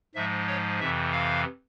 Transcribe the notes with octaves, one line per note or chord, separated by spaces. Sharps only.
G#2 F3 G#3 E5
C#5
F2 C3 E3 E5
F5